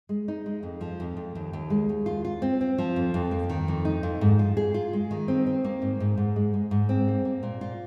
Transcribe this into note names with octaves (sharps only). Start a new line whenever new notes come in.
G#3
D#4
G#3
F2
F3
F2
F2
D#2
D#2
G#3
D#2
F4
F4
C4
C4
F3
F2
F2
A#3
D#3
F2
D#4
F2
G#2
F4
G#4
F4
G#3
D#3
C4
C4
A#3
G#2
G#2
G#2
G#3
G#3
G#2
C4
A#3
A#3
A#2
F4